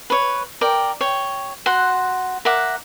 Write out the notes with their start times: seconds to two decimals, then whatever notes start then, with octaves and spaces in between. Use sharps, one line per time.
0.10 B4 C#5
0.61 A#4 D5 G5
1.01 C#5 G5
1.66 F#4 F#5 C6
2.45 A#4 E5 F#5 D6